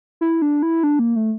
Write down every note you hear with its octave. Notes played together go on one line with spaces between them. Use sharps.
E4
D4
E4
D4
A#3
A3